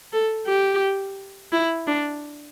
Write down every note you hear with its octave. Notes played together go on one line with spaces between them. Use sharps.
A4
G4
E4
D4